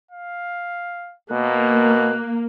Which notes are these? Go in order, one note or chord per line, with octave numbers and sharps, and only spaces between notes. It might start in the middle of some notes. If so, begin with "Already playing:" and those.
F5
B2 A#3 F#6